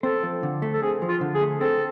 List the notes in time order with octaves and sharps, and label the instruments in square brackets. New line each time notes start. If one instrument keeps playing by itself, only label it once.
[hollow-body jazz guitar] C4 [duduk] A4
[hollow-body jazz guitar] F3
D3
A3
[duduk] A4
[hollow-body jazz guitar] C4 [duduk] G#4
[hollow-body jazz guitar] F3
[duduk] F4
[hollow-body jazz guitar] D3
[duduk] G#4
[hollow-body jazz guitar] A3
[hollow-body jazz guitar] C4 [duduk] A4